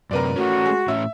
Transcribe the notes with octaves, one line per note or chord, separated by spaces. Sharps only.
F#2 C3 A#4 B4 D5
A3 C#4 F#4
G#3
A2 C#4 E5